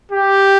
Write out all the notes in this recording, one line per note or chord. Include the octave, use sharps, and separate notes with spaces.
G4